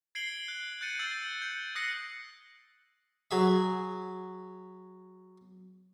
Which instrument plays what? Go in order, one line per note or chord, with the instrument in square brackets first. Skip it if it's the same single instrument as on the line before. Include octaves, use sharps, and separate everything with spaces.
[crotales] G#6 C7 D7 F#7 G7
F#6
F#6 G6 A6 C#7 D#7
E6 G6 A6 C7 F#7
G6 C#7
D#6 E6 F#6 A#6 C7 C#7
[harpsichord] F#3 G#4 E5